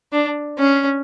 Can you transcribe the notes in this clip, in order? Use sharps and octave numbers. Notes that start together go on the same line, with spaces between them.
D4
C#4